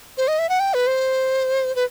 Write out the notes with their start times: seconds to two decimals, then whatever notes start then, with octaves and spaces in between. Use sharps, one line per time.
0.18 C5
0.28 D#5
0.39 E5
0.49 F#5
0.60 G5
0.74 B4
0.87 C5
1.76 B4